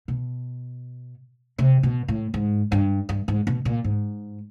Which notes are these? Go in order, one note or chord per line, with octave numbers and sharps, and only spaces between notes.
B2
C3
B2
A2
G#2
G2
G2
G#2
B2
A#2
G#2